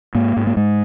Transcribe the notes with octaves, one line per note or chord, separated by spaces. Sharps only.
G#2 A#3
G#2
A#3
G#2 G#3